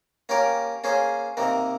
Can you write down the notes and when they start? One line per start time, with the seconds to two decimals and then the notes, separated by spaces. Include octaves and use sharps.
0.29 A#3 C#4 G4 A#4
0.84 A#3 C#4 G#4 C5
1.37 C3 D#3 A#3